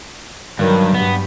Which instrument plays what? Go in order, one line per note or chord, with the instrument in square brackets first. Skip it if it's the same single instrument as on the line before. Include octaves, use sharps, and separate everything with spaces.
[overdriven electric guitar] G2 [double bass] D#3 F#3
[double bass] G2 [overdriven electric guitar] B3